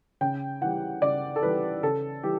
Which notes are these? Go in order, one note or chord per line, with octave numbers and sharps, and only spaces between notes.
C#3 G5
E3 G3 F#5
C#3 D5
A4
E3 G3 B4
C#3 A4
E3 G3 G4